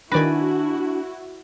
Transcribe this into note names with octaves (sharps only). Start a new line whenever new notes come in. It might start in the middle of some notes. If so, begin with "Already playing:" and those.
D#3 D4 E4 F#4 B4 D5 G#5 A#6